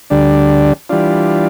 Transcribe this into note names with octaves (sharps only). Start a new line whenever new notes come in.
D2 D3 G3 D4
E3 G3 D4 F4